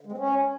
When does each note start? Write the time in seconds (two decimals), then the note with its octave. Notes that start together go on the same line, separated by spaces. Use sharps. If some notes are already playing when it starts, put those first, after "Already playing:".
0.01 D3
0.07 G#3
0.12 C4
0.18 C#4